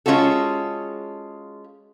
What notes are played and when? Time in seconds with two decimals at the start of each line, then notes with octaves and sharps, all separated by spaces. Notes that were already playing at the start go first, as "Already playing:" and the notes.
0.06 G#3 C#4 F4 F#4 A4